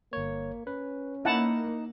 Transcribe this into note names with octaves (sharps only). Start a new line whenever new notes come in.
G1 A#3 C#5
C#4 B4
A#3 D#4 E4 F#5 A5